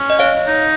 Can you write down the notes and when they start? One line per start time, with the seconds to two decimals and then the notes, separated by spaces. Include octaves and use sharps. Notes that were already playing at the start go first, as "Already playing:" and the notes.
Already playing: C#4
0.10 D#5
0.19 C#5 F5
0.47 D#4